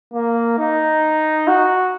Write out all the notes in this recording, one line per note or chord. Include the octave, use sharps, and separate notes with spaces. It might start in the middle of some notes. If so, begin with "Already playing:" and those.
A#3
D#4
F#4